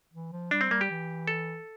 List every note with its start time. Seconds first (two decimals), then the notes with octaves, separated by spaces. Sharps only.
0.14 E3
0.32 F3
0.51 G3 D4
0.61 C4
0.71 G3 A#3
0.81 G4
0.90 E3
1.28 A4